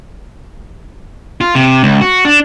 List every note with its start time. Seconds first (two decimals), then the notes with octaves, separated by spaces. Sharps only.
1.41 F4
1.55 C3
1.83 C#2
2.01 F#4
2.25 D4